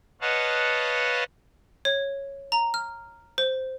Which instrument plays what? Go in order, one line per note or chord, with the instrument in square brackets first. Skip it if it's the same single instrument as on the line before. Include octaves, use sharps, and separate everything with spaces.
[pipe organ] B4 C#5 D#5 F5 F#5 A5
[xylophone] C#5
A#5
F6
C5